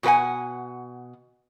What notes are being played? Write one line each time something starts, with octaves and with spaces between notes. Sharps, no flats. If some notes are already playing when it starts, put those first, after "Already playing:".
B2 G4 B4 F#5 G#5